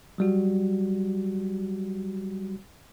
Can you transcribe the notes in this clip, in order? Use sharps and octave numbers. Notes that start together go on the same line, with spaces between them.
F#3 G3 F#4